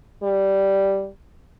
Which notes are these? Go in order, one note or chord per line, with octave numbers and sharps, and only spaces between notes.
G3